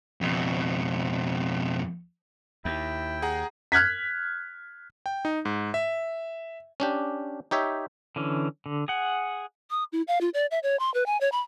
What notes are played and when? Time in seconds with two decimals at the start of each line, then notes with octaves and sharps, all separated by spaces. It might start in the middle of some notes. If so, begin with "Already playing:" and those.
0.21 F2 B2
2.65 D#2 E4 G5
3.22 G#4 F#5 A#5
3.72 F6 F#6 G#6 B6
5.06 G5
5.25 D#4
5.45 G#2
5.74 E5
6.80 C#4 D4 G4
7.51 D#4 G4 C#5 E5
8.16 D3 E3 C#4
8.66 D3
8.88 G#4 F#5
9.70 D#6
9.92 E4
10.08 F5
10.21 F4
10.34 D5
10.51 E5
10.63 C#5
10.79 C6
10.94 B4
11.06 G#5
11.21 C#5
11.32 B5